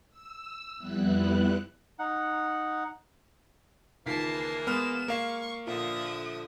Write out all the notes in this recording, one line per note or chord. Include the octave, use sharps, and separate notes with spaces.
E6
F2 G3 B3 E4 F#6
D#4 F#5
C#2 D#3 E3 A#3 A5 B6 C7
G#3 B3 F6 E7
A#3 F5 C#6 C7
A#2 D3 F3 E5 D#6